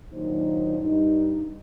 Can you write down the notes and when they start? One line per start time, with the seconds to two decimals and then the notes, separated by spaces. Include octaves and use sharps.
0.12 D#2 A#2 F#3 D4 D#4 C5
0.80 G2 D#4